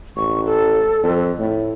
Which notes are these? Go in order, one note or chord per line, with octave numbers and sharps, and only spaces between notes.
A1 C#6
A4
F2
A2